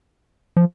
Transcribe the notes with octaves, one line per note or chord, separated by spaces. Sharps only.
F3